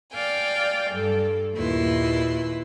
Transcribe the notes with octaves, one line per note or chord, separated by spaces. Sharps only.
D5 F5 G5 G#5
G2 A4
D#2 A#2 E4 B4 C6